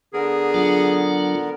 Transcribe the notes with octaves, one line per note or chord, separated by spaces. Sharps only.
D3 B3 G#4 A#4
F#3 D4 F4